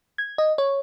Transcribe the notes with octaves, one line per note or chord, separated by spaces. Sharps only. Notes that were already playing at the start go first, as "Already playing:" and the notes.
G#6
D#5
C#5